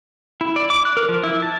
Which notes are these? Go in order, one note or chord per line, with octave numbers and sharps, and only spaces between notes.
E4
D5
D6
F#6
A#4
F3
E4
A5